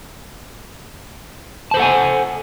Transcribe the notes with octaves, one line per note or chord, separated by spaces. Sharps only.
A4 C5 F#5 G#5 A5